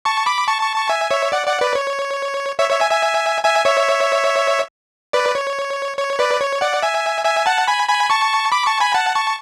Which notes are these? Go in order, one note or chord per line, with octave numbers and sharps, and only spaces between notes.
A5 C#6
B5 D6
A5 C#6
A5 C#6
A5 C#6
E5 G#5
C#5 E5
D5 F#5
D5 F#5
B4 D5
C#5
C#5 E5
C#5 E5
E5 G#5
E5 G#5
E5 G#5
C#5 E5
B4 D5
C#5
C#5
B4 D5
C#5
D5 F#5
E5 G#5
E5 G#5
F#5 A5
G#5 B5
G#5 B5
A5 C#6
B5 D6
A5 C#6
G#5 B5
F#5 A5
A5 C#6